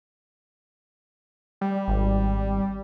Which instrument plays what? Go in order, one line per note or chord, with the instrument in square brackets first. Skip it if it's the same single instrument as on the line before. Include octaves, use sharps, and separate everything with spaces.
[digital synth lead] G3
[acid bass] G#1